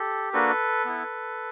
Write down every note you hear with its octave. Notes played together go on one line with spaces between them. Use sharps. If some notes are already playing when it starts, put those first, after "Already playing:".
Already playing: G4 A4
A#3 D4 F#4 A4 B4
B3 E4